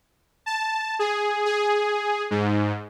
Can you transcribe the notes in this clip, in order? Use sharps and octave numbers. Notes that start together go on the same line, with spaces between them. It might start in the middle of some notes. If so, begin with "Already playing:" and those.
A5
G#4
G#4
G#2